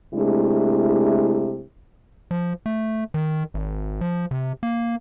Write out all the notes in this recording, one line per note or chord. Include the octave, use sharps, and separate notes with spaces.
C3 G#3 A3 D4 E4
F3
A3
D#3
G#1
F3
C3
A#3